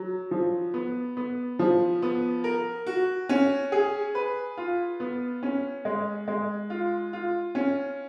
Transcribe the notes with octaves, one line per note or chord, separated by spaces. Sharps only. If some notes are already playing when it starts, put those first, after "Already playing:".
Already playing: F#3
F3
B3
B3
F3
B3
A#4
F#4
C#4
G#4
B4
F4
B3
C#4
G#3
G#3
F4
F4
C#4